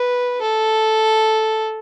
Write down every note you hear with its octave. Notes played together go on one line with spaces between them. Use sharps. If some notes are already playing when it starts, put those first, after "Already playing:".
Already playing: B4
A4